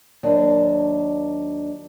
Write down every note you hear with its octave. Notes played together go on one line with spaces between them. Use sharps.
D#2 F#3 D4